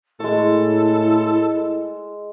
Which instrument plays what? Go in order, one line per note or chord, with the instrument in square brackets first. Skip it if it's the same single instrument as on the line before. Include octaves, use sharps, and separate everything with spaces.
[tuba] A2 [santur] G#3 C#6 [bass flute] E4 [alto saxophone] A4